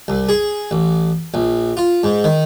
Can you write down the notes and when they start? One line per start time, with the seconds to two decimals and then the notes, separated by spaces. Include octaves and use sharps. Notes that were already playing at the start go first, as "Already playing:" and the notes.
0.08 C2
0.29 G#4
0.71 A1
1.34 A#1
1.77 F4
2.03 G#2
2.24 D#3